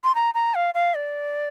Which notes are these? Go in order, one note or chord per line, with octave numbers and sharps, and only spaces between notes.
C6
A#5
A#5
F5
F5
D5